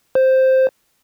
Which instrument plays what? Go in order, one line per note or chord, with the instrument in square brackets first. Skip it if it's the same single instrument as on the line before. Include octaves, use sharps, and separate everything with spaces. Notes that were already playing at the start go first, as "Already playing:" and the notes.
[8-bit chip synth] C5